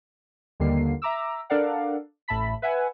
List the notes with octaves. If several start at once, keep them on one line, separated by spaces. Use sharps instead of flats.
D#2 D3 D#3 G3 A#3 C7
E5 A#5 D6 E6
D4 A4 A#4 D5 F5 F#5
A1 A2 E5 A5 B5 B6
B4 E5 F#5 G#5